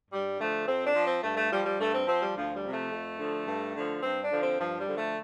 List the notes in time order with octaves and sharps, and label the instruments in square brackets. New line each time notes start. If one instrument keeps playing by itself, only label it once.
[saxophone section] G2 G3
D3 F3 A3
F2 C4
D4
F3
C4
G2 A3
A3
F3 G3
G3
G2 A3
C4
F3 C4
G3
D2 F3
G3
C3 F3
A3
F2
D3 F3
G2
D3 F3
G2 C4
D4
D3 F3
C4
G2 F3
G3
D3 F3
A3